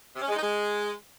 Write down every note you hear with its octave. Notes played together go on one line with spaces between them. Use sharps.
C3
C#4
G#3
D#4
G#3